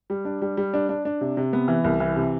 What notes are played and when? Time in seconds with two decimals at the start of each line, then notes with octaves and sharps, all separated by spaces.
0.10 G3
0.25 D4
0.42 G3
0.57 G3
0.74 D4
0.89 D4
1.05 D4
1.21 C3
1.37 C3
1.53 B3
1.68 E3
1.84 C2
2.00 E3
2.16 C3